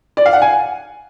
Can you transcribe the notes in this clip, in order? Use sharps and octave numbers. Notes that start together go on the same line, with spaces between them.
D5
F5
F#5
G#5